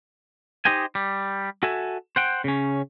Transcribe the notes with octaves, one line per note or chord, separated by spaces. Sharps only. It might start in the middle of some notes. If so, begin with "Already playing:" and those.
D#4 G4 C5 D#5 G5 G#5
G3
F#4 A4 E5 G#5
C5 F#5 G5
C#3 C#4